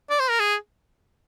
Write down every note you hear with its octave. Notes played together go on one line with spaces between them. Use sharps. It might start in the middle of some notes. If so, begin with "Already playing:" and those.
D5
C5
A#4
G#4